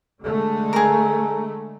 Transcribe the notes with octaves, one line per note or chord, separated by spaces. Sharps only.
D3 G#3 A3
G#4 A#4